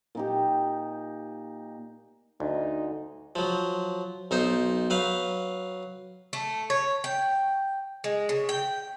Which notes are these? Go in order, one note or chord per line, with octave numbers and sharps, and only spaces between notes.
A#2 D#4 G4
D2 D#4
F3 F#3
B1 D#4 C5
F#3 B4 F5
A3
C#5
G5
G#3
C#3
G5